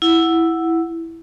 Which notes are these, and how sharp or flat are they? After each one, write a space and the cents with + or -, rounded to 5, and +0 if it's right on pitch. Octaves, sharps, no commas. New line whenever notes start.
E4 +0 F#5 -5